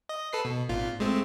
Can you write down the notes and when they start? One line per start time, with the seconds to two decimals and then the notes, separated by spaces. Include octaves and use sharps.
0.09 D#5
0.33 A4 B4 C7
0.45 B2
0.69 G#1 A#2 F4
1.00 G#3 A3 C4